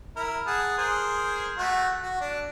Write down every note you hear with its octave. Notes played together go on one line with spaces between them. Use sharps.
E4 A#4
G#4 F#5 A5
G#4 A#4 C5
A3 F#4
F#4
D4